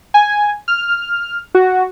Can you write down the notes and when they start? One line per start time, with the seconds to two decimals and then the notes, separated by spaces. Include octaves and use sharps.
0.14 G#5
0.68 F6
1.55 F#4